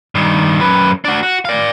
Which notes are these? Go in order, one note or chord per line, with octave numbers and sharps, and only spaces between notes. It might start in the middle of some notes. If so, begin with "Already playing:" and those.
G2 D#3
F#2 B4
D4 F#4
F#4
D5 F5